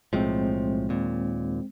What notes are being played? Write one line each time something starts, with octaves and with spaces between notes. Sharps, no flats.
B1 A2 F3 G#3 C4
D#2 A#2